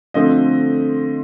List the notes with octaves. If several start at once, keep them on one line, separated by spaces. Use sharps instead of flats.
D3 F3 A3 C4 D#5